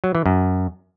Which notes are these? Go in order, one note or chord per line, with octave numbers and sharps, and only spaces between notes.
F#3
E3
F#2